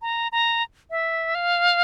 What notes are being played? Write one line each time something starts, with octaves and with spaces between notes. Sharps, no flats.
A#5
A#5
E5
F5